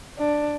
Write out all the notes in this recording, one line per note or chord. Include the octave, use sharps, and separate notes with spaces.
D4